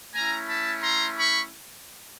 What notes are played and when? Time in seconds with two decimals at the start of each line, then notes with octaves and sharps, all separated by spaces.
0.14 A3 C#4 E4 G#5 A#5
0.49 A5 B5
0.83 A#5 C6
1.17 B5 C#6